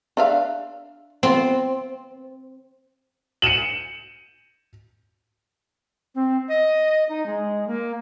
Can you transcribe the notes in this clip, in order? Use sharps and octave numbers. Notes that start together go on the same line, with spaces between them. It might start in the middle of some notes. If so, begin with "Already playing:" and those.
D4 E5 F5
B3 C4 F4
C#7 D#7 E7 F#7
C4
D#5
D#4
G#3
A#3